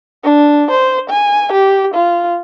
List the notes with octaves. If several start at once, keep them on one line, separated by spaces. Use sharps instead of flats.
D4
C5
G#5
G4
F4